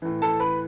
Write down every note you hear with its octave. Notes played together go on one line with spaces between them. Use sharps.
A2 E3
A4 A5
B4 B5